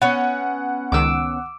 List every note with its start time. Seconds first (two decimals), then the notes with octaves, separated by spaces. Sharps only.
0.02 B3 C#4 F#5
0.92 C#2 D#3 D6 E6